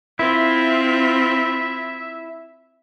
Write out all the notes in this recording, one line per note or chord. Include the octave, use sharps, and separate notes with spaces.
C4 E4 F4 E5